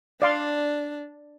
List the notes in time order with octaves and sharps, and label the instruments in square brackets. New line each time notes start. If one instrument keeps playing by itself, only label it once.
[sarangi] D4 [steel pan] D5 F5 C6